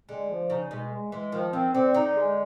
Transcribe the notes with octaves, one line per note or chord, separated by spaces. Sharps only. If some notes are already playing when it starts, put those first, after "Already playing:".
D3 G#3
F3
C#3 D#4
B2 G#3
G#3
E3 G#3
D#3 F3
D#3 C4
D3 C4
D3 D#4
G#3